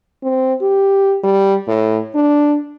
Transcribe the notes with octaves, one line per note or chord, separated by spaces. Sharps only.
C4
G4
G3
A2
D4